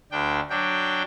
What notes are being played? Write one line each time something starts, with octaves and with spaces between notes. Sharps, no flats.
D2 D4 G5
F#3 D4 G5